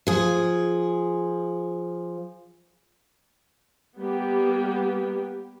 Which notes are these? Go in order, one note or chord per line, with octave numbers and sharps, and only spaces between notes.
F3 G#4
G3 A#3 B3 G4